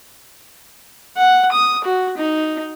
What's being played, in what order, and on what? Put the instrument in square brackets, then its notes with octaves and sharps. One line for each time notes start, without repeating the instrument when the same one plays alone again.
[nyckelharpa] F#5
D#6
F#4
D#4